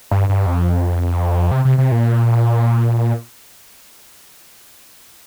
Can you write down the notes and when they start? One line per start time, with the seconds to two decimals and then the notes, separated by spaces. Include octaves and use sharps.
0.11 G2
0.29 G2
0.46 F2
1.51 C3
1.65 C3
1.78 C3
1.92 A#2